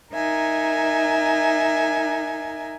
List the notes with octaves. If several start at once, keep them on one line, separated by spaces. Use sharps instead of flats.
D#4 A#4 E5 G#5